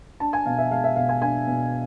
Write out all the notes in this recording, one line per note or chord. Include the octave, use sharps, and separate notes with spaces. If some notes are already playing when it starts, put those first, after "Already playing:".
D4 A5
G#5
B2 F5
E5
G#3 F5
E5
B2 F5
G#5
D4 G#5
B2